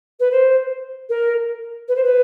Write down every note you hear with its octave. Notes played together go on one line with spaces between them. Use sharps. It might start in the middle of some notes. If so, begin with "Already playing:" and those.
B4
C5
A#4
B4
C5
B4